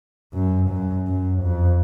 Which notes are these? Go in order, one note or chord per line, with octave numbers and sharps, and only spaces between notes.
F#2
F#2
F#2
F2